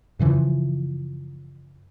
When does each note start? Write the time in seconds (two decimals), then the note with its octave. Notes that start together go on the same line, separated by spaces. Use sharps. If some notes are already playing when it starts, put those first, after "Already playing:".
0.19 F#2 C#3 E3 F3